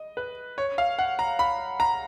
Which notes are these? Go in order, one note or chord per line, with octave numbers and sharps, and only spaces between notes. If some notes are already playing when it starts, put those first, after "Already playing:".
Already playing: D#5
B4
C#5
F5
F#5
A#5
B5
A#5